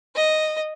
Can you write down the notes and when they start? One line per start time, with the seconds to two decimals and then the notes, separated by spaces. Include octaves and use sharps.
0.15 D#5